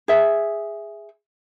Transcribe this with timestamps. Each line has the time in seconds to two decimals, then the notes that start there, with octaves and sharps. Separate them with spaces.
0.08 G#4 E5